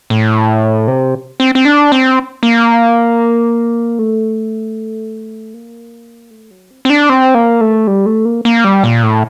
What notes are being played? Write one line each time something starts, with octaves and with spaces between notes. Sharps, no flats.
A2
C3
C4
C4
D4
C4
A#3
A3
A#3
A3
F#3
C4
C4
D4
C4
A#3
A3
G3
A3
A#3
A#3
G3
A#2
A2